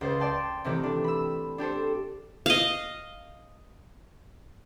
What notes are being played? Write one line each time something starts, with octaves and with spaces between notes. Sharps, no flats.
C#2 C5 A6
D5 G5 A5 C6
C3 D#3 E3 A3 C4 G4
D4
B5 E6
D4 G4 A4 C5
D#5 F5